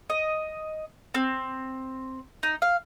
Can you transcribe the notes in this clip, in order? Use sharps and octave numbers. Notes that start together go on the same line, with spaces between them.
D#5
C4
D#4
F5